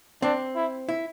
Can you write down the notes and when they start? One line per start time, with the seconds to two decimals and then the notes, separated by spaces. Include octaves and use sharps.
0.22 C4 D4
0.56 E4
0.89 E4